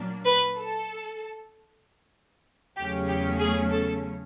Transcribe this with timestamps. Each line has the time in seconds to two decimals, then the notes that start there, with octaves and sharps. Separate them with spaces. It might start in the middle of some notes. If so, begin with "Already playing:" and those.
Already playing: A#2 F#3 A#3 D4
0.24 B4
0.56 A4
2.76 E2 C#3 F#3 A3 C#4 G4
3.08 G4
3.39 G#4
3.71 A4